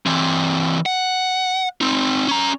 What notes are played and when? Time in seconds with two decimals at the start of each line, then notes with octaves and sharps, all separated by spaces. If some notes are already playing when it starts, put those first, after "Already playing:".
0.06 E3 C4
0.86 F#5
1.81 C4 D#4
2.28 C#4 A#5